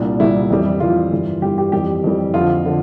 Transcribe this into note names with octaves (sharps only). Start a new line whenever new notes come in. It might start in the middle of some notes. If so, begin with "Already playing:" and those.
Already playing: C2 A#2 G3 D4
C2 A#2 G3 E4
F2 E3 G3
F2 E3 G3 F4
G2 E3 G3
G2 E3 G3 G4
G4
F2 E3 G3 G4
F2 E3 G3
F2 D3 F3 F4
D3 F3